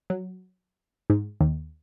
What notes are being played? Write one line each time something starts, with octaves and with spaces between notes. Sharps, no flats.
F#3
G#2
D#2